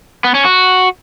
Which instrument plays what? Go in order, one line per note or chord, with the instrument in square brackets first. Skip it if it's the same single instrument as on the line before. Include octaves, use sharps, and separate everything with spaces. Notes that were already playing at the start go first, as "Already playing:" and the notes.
[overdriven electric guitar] B3
C#4
F#4